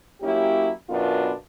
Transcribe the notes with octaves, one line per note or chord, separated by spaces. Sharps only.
F#3 A#3 C#4 E4 G4
F#2 B2 B3 D4 F4 A#4